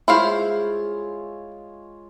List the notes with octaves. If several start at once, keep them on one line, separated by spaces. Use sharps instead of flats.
G#3 E4 F4 C5 C#5 F5